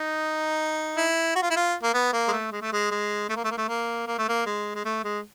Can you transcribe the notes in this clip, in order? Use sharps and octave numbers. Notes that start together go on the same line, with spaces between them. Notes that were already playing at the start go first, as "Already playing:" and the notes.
Already playing: D#4
E4
F#4
F4
E4
F4
A#3
B3
A#3
G#3
A3
G#3
A3
G#3
G#3
A3
A#3
A3
A#3
A3
A#3
A#3
A3
A#3
G#3
G#3
A3
G#3